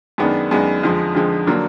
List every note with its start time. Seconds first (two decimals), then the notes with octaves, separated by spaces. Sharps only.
0.18 F#2 D#3 G#3 B3 D4
0.51 F#2 D#3 G#3 B3 D4
0.83 F2 D3 F3 G#3
1.15 F2 D3 F3 G#3
1.47 D3 F#3 A#3 D4